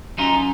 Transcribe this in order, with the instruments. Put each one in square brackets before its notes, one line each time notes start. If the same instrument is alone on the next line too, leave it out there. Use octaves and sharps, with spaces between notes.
[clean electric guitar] F#2 D#4 F4